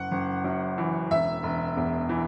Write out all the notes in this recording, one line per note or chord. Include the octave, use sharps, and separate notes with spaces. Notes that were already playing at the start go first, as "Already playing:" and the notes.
Already playing: F#1 F#5
F#1
F#2
E3
E1 E5
E1
E2
E3